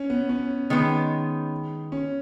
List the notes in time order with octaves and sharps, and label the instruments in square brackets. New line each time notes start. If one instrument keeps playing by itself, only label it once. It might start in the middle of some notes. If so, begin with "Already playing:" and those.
Already playing: [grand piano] C#4
B3
C#4
[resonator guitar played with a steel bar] D#3 G#3 B3
[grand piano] C#4